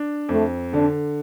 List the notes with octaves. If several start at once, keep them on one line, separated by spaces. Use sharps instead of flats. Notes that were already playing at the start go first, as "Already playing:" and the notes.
Already playing: D4
F2 A3
D3 D4